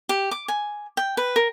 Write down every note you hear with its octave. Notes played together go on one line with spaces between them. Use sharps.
G4
D6
G#5
G5
B4
A#4